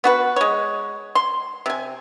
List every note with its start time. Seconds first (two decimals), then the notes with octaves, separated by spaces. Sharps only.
0.04 B3 F#4 B4
0.36 G#3 C#5
1.15 C6
1.66 C3 G#5